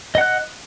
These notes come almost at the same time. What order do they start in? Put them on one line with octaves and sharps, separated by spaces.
D#5 F#5 F#6